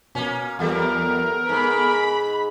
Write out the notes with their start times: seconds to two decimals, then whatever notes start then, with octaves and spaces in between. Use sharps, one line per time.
0.15 B2 A#3 C#4
0.59 E2 G3 B3 A4 A#4
1.49 G#2 B5